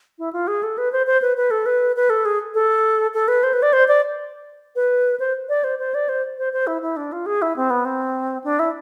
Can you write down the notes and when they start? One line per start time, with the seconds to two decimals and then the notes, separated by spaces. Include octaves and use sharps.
0.19 E4
0.33 F4
0.47 G#4
0.63 A4
0.78 B4
0.92 C5
1.07 C5
1.22 B4
1.37 B4
1.51 A4
1.66 B4
1.96 B4
2.10 A4
2.25 G#4
2.54 A4
3.14 A4
3.28 B4
3.43 C5
3.53 B4
3.62 D5
3.73 C5
3.88 D5
4.76 B4
5.20 C5
5.49 D5
5.64 C5
5.79 C5
5.94 D5
6.09 C5
6.38 C5
6.53 C5
6.67 E4
6.82 E4
6.97 D4
7.12 F4
7.26 G#4
7.42 E4
7.56 C4
7.70 B3
7.85 C4
8.44 D4
8.59 E4